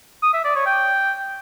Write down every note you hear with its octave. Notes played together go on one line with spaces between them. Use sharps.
D#6
E5
D5
C#5
G5